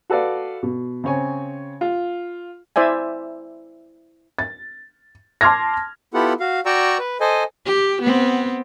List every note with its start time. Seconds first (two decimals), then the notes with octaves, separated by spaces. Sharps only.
0.10 F#4 A4 B4 D5 F5
0.63 B2
1.04 C#3 C4 C#5 G#5
1.81 F4
2.76 E4 C5 D5 E5 G#5
4.39 A6
5.41 A5 C6 D6 F6 G#6 A#6
6.14 B3 E4 F4 G4 A4 F#5
6.40 F#4 F5
6.66 F#4 D5 G5 A#5 C#6 E6
6.99 B4
7.20 A4 C5 D#5 G#5
7.66 G4
8.02 B3 C4